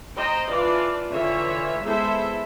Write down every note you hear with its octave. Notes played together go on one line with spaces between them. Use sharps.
C5 D#5 G5 A#5
E3 D4 F4 D5
D3 E3 F4 C#5 E5
G#3 B3 E4 A4 C5 E5